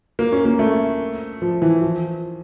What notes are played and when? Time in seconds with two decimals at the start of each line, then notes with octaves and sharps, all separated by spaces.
0.19 A#3
0.32 C#4
0.45 A#3
0.59 A3
1.42 F3
1.62 E3
1.82 F3